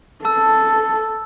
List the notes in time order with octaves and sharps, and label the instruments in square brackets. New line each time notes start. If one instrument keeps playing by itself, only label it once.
[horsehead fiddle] A4 [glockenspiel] A5 E6